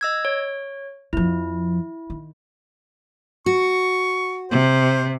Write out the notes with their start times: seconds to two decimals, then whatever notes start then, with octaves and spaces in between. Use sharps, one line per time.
0.01 D#5 E6 G#6
0.25 C#5
1.13 F2 F3 E4
2.10 D#3
3.46 F#4 C#6
4.51 C3 C5